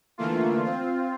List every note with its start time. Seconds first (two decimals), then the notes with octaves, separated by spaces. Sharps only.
0.18 D3 E3 A3 A#3 F4
0.64 C4 F4